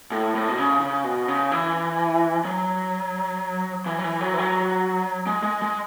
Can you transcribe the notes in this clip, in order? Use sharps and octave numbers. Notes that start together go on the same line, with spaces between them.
A2
A2
B2
C#3
C#3
B2
C#3
E3
F#3
E3
F#3
E3
F#3
E3
F#3
G#3
G#3
G#3